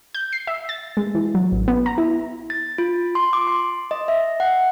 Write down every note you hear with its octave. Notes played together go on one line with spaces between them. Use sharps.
G6
C7
E5
A6
G#3
E3
F#3
A1
B3
A#5
E4
A6
F4
C6
D6
C6
D#5
E5
F#5